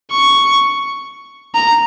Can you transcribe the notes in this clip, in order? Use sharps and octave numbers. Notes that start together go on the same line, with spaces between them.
C#6
A#5